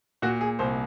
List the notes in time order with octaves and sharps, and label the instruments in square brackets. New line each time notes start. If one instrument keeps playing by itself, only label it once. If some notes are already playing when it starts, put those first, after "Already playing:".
[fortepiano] A#2 [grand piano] F#4
[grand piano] G#4
[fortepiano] C2 [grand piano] C5